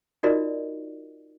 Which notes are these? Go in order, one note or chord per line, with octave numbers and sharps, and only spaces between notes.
D#4 F4 F#4 A#4 D5 D#5